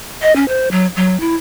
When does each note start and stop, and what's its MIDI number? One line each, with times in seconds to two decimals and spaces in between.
0.22 0.34 75
0.36 0.45 61
0.48 0.69 72
0.71 0.87 54
0.96 1.19 54
1.20 1.35 64